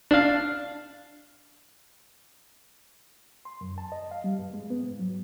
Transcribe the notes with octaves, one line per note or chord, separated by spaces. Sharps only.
D4 F5
C6
F#2
A5
D#5
F5
G3
G2
G#3
B3
G#2
F#3